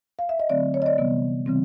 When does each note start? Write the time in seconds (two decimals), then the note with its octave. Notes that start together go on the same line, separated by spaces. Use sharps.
0.19 F5
0.29 E5
0.40 D#5
0.50 D3 F#3 A3 C4 D5
0.74 C#5
0.82 D#5
0.86 D5
0.98 C3 E3 G3 B3
1.46 C#3 E3 G3 C4